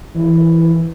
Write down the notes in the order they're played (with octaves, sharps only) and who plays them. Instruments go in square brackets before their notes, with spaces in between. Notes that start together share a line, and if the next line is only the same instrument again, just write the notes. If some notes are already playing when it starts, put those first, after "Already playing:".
[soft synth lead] E3